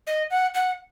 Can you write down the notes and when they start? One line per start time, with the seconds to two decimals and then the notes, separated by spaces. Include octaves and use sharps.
0.07 D#5
0.31 F#5
0.54 F#5